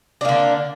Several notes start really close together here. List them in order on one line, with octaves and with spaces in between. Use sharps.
D4 A#3 D3